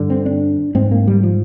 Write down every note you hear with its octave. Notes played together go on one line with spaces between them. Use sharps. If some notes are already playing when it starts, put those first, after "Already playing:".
Already playing: G2 D3
C4
D4
G#2 C4
A#3
G3
F3